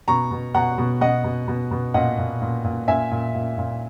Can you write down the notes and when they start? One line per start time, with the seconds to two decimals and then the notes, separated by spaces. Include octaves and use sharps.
0.08 B2 A#5 C#6
0.31 B2
0.55 B2 F#5 A#5
0.78 B2
1.01 B2 D#5 F#5
1.24 B2
1.48 B2
1.71 B2
1.94 A#2 D#5 F#5
2.18 A#2
2.42 A#2
2.64 A#2
2.88 A#2 E5 G#5
3.11 A#2
3.35 A#2
3.58 A#2